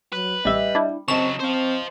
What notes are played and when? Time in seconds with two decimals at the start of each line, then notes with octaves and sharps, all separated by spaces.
0.13 F#3 B4
0.45 A1 G3 D#5 E5
0.75 D4 E4
1.08 C#3 F#3 C4 D#5 A5 C#6 E7
1.40 C4 C5 F5